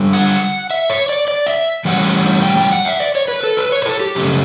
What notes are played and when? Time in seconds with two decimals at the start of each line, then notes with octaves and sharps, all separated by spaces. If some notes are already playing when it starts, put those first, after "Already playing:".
Already playing: D3 G3 D4
0.13 F#5
0.71 E5
0.90 C#5
1.09 D5
1.28 D5
1.47 E5
1.85 A2 E3 G3 C#4 F#5
2.43 G5
2.57 G5
2.72 F#5
2.85 E5
3.00 D5
3.15 C#5
3.28 B4
3.43 A4
3.57 B4
3.72 C#5
3.82 B4
3.86 A4
4.00 G4
4.15 F#2 C#3 A3